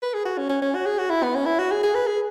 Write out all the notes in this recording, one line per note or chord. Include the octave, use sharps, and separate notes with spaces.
B4
G#4
F#4
C#4
C#4
C#4
F#4
G#4
F#4
E4
B3
C#4
E4
F#4
G#4
G#4
B4
G#4